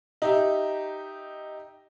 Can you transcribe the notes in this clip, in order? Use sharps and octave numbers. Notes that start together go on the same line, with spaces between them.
D#4 G4 E5